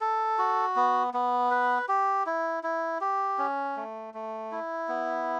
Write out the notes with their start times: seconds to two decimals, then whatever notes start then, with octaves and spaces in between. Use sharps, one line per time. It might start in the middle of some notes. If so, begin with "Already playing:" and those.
0.01 A4
0.38 F#4
0.76 B3
1.14 B3
1.51 B4
1.89 G4
2.26 E4
2.63 E4
3.01 G4
3.38 C#4
3.76 A3
4.14 A3
4.52 E4
4.88 B3